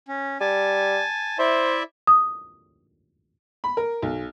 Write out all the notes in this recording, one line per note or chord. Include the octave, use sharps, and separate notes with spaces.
C#4
G3 G#5 A5
E4 C5 D5 E5
D#6
B5
A#4
B1